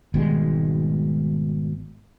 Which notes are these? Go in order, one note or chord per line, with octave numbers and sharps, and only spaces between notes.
G#1 B2 G3 G#3